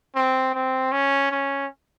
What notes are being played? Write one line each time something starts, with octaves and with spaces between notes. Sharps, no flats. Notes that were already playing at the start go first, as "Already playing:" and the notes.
C4
C4
C#4
C#4